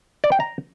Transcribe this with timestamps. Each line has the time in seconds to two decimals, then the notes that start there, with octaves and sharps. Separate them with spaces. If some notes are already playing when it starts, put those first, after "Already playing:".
0.24 D5
0.32 G5
0.40 A#5